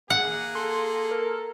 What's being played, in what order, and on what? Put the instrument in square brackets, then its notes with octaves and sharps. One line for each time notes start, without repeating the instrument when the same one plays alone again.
[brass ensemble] A#3 G#4 [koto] F#5
[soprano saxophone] A4 [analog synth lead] C6
[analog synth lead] A#4